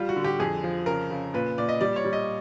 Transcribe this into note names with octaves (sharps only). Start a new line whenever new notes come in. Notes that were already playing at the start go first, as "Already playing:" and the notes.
Already playing: G3 F4
F#4
D3
G4
F2 G#4
F3
C#3 A#4
C#3
A#2 B4
A#2 D5
D#5
G3 D5
C#5
G3
D#5